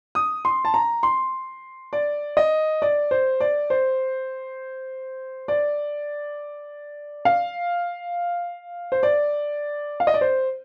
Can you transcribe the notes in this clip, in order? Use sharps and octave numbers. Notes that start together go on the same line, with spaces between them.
D#6
C6
A5
A#5
C6
D5
D#5
D5
C5
D5
C5
D5
F5
C5
D5
F5
D#5
D5
C5